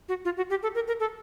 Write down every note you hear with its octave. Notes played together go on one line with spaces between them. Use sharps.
F#4
F4
F#4
G4
A4
A#4
A#4
A4